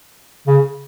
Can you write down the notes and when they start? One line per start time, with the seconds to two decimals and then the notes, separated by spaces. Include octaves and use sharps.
0.47 C#3